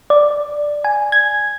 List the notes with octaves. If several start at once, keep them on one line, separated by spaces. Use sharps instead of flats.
D5
G#5
G#6